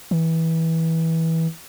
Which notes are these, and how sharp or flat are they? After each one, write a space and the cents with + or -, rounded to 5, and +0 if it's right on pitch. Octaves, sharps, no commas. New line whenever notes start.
E3 -20